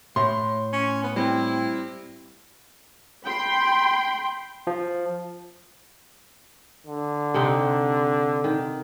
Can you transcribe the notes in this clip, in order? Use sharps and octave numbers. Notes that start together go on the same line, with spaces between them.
A2 C6
C#4
B3
G3 C4 E4
G5 B5 C6
F3
D3
C3 C4 D#4
D#3